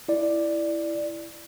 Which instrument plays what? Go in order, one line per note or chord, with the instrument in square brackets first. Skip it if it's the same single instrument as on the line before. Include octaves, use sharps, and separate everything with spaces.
[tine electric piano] E4 D5